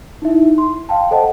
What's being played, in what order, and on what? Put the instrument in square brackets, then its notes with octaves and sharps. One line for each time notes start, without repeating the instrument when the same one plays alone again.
[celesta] D#4 E4 E5
C6
F5 G5 A5
A4 C5 D#5 F#5 A5